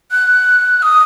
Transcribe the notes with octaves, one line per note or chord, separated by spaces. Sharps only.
F#6
D#6